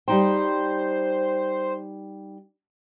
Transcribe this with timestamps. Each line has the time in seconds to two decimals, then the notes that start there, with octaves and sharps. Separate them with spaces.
0.08 G3 D#4 C5 G5